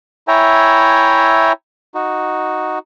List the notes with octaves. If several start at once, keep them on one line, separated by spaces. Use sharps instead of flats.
E4 C#5 E5 G5 G#5 A#5
D#4 F#4